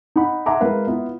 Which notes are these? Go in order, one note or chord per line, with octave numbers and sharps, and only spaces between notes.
D#4 F#5 B5
E5 F#5 G#5 A#5 C6 D6
G#3 E4 A#4 B4 F5
B3 E4 F4